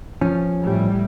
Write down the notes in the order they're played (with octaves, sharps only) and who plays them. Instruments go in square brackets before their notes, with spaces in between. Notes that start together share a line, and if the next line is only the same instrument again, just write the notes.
[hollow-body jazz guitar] F3 C#4
[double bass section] A2 G3